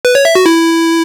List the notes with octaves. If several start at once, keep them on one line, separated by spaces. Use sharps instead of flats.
B4
C#5
E5
F#4
E4